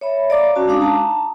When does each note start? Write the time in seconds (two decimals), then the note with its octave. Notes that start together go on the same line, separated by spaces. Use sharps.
0.01 C#5 E5 B5
0.30 D5 F5 A#5 D6
0.56 C#4 F#4 A5
0.67 G#3 D4 D#4 F5 D6 D#6
0.81 A5 A#5